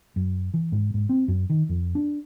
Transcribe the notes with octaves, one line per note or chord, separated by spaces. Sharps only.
F#2
E3
G#2
G#2
C4
F#2
D#3
F2
D4